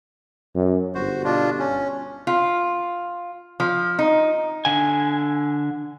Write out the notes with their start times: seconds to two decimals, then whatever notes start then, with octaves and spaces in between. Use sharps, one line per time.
0.55 F#2
0.95 G1 F#4 C5
1.25 B2 D4 F4
1.59 C#4
2.27 F4
3.60 F3
3.99 D#4
4.65 D3 G#5